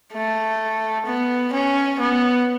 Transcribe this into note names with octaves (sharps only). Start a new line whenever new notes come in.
A3
B3
C#4
B3